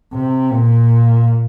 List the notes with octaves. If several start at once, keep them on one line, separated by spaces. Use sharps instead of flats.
C3
A#2